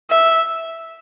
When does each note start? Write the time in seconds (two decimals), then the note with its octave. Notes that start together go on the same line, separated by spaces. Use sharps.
0.10 E5